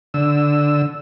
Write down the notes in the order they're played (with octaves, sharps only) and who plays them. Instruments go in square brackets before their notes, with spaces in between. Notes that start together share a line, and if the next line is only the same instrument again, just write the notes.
[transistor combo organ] D3 E6